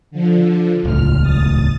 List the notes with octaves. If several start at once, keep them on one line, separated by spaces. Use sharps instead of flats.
D3 F3
D#1 C#2 A2 F6
D#6 A6